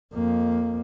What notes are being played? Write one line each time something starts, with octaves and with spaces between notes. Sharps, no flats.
F2 A#3